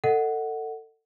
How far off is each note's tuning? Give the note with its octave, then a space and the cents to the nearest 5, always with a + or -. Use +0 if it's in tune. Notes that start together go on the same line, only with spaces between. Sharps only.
A4 +25 D#5 +0 F#5 +0